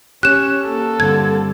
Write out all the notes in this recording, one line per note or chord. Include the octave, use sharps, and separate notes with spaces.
C#4 G4 C#5 F#6 E7
A#3 A4
G2 D3 C4 G#6